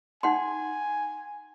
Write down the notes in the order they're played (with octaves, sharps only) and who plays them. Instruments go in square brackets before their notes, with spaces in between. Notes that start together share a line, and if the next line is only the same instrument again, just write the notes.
[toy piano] D#4 F#5 C6 [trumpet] G#5